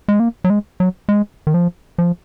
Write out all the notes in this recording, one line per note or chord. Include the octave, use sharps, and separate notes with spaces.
G#3
A#3
F#3
G#3
F#3
G#3
D#3
F3
F3